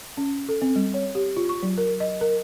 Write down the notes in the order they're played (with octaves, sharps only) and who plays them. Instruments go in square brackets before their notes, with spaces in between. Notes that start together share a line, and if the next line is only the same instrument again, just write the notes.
[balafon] C#4
A4
C4
G3
C#5
G4
F4
C#6
F#3
A#4
D#5
A#4